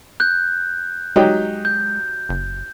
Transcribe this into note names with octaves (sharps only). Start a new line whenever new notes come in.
F#6 G6
F#3 G#3 D#4 G4
G6
F#1